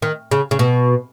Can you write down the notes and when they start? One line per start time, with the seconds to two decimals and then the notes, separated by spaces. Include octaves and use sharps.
0.02 D#3
0.31 C#3
0.51 C#3
0.59 B2